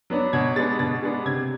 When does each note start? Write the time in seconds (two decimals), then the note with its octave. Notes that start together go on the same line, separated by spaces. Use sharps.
0.10 F#3 B3 D4
0.33 B2 G#6
0.56 G#3 B3 D4 A6
0.79 B2 A6
1.03 G#3 B3 D4
1.25 C3 G#6